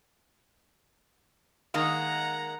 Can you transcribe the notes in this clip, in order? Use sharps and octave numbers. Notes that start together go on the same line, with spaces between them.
D#3 G#3 A#3 F#5 A#5